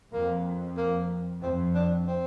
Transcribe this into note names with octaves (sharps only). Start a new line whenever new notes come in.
F2 A#3
A#3
F2 C4
D4
C4